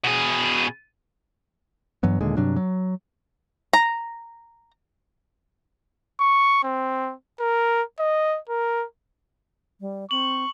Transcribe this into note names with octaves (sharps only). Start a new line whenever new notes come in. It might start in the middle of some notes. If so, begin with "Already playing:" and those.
B2 G#4
G2 E3 F#3 B3
D#2 A#2 D3 G#3
G2 C3 F#3 D4
F#3
A#5
C#6
C4
A#4
D#5
A#4
G3
C4 C#6 F#7